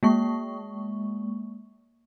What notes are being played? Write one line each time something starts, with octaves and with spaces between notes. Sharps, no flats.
G#3 A#3 C#6